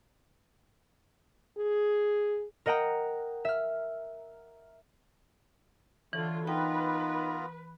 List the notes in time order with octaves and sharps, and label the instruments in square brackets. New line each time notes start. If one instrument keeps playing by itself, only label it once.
[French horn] G#4
[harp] A#4 D#5 F#5 G5 A#5
E5 F6
[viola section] D3 F4 [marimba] E3 [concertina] C#5
[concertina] B3 F4 A#4 [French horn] D#4 [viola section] B4 [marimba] G5